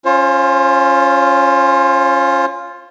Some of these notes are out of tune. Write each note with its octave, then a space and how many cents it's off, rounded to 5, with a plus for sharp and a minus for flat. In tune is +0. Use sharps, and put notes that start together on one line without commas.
C#4 +0 F4 +0 C5 +40